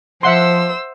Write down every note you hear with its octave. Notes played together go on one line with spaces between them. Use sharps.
F3 C5 E5 F#5 C6 E6